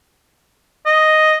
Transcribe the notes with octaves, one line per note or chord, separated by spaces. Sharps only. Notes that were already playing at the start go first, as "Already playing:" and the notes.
D#5